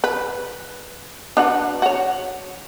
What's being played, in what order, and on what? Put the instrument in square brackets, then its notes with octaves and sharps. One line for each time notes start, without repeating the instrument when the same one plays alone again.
[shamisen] B4
D4 F#4 B4
F#4 C#5